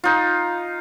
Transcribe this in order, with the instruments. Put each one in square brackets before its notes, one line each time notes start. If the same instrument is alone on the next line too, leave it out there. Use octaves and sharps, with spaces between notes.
[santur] D#4 F4